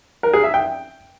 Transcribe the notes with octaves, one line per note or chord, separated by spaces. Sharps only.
A#4
G#4
E5
G5